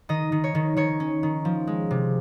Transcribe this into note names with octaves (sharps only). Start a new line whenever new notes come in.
D#3 D#5
D#3
C#5
D#3
D#3 C#5
C#4
D#3
F3
G#3
C3